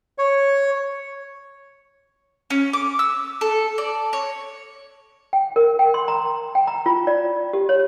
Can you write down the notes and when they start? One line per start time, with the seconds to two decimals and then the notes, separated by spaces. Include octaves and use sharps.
0.18 C#5
2.50 C#4
2.73 D6
2.99 E6
3.41 A4
3.78 D5
4.13 C#5
5.33 G5
5.56 A#4
5.79 G5
5.94 C6
6.08 A#5
6.55 G5
6.67 A#5
6.86 F4
7.07 D5
7.53 G4
7.69 C#5